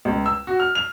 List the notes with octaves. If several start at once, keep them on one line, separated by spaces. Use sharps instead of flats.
C#2
E6
F#4
F6
F7